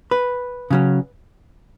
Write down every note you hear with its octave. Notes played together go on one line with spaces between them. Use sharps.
B4
C#3 F#3 C#4